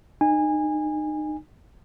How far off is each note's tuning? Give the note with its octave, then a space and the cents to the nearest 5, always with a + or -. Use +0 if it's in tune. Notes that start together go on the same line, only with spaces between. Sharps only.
D#4 -30 G#5 -20